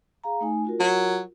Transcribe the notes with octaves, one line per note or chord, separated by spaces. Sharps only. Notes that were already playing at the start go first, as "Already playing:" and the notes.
G#4 F5 A#5
A3 D#4 G#5
F4 F#4 A#4
F#3